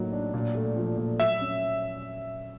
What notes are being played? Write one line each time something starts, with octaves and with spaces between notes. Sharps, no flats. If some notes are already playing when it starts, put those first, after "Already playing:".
Already playing: A2 F#3 A#3 D#4
D4
A#2
A3
F3
A#2
F#3 E5
C#4